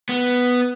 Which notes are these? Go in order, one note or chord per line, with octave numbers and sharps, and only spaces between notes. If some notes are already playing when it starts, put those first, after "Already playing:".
B3